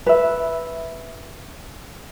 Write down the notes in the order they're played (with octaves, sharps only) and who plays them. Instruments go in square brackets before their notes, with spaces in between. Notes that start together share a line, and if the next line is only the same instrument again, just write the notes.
[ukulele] B4 E5